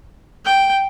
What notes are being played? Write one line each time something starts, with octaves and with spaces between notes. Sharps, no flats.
G5